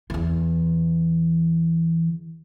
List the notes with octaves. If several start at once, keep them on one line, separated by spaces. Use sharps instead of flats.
E2 E3